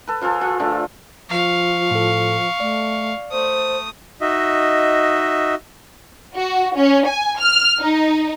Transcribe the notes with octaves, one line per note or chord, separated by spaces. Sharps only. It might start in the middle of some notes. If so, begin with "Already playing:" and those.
A4 B4
F3 F4 G#4 A4
F4
D3 A3
F3 F5 C#6
A2 A4
A3 D5
A3 C5 D#6
D#4 F#4 D#5 E5
F#4
C#4
G#5
F6
D#4